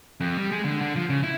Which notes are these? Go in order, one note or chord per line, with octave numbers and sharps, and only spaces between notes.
F2
G3
G#3
D3
D3
F3
C#3
E4